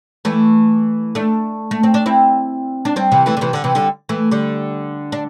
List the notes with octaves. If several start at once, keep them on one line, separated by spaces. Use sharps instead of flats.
E3 A3
A3 D4
A3
C4
D4
C4 E4
D4
G3 C4
C3 E3
E3 A3
D3
C3 E3
D3
C3 E3
D3 G3
E3 A3
D3 G3
D4